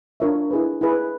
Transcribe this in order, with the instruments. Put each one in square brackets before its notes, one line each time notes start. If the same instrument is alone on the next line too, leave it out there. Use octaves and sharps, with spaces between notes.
[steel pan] D4 F4 A#4 C#5 E5
E4 G#4 B4
E4 G#4 B4